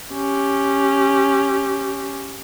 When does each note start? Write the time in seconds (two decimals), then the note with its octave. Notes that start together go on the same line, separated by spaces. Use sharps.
0.14 C#4 G4